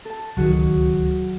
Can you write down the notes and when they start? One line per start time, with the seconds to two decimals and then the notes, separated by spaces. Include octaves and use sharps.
0.05 A4 A5
0.37 D1 C#2 D#3 F#3 F#4 G#4